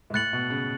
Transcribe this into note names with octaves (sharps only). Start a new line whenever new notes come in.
G#2
A2 F#6 A6 C#7 F#7
B2
C#3